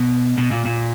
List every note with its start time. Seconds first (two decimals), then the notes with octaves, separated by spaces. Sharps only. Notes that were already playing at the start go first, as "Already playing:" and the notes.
Already playing: B2
0.38 B2
0.51 A#2
0.65 A#2